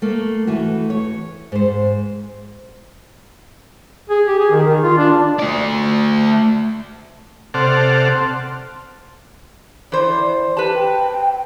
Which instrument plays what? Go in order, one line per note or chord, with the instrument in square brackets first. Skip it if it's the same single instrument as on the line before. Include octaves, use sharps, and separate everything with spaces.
[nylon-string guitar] A3 A#3
E3 A3 F#4
C#5
G#2 C5
[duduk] G#4
G4
G#4
D#3
D#3
F4
D4
[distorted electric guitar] A3 D5
[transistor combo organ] C3 A4 C5 D5 F#5 F6
[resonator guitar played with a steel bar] E3 C5 [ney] D5
[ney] G4 [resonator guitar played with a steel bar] B4 A5
[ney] G5